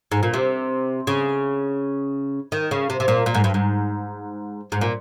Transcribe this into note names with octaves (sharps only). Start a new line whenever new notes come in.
G#2
A#2
C3
C#3
D#3
C#3
C3
C3
A#2
A#2
G#2
G2
G#2
G#2
A#2